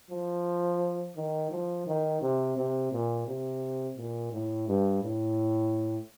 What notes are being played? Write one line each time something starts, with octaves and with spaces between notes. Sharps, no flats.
F3
D#3
F3
D#3
C3
C3
A#2
C3
A#2
A2
G2
A2